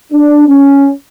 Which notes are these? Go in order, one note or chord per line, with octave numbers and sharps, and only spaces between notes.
D4
C#4